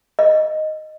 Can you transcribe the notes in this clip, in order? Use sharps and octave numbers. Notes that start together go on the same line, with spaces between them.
D#5